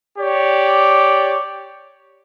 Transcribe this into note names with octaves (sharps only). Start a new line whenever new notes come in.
G4 C#5 D5